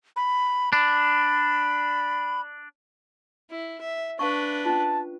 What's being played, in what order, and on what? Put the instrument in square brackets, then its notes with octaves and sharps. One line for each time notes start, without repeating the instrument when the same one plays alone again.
[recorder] B5
[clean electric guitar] D4 [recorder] B5
[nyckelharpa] E4
E5
[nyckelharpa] D4 B4 [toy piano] F5 A5 C#6
[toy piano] C#4 F4 [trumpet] A5